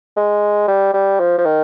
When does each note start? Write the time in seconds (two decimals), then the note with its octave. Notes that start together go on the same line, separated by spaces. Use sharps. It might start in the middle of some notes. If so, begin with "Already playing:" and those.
0.16 G#3
0.68 G3
0.94 G3
1.20 F3
1.38 F3
1.45 D#3